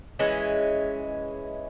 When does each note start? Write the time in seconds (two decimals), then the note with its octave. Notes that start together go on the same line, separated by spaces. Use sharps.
0.19 E3 G#3 C#4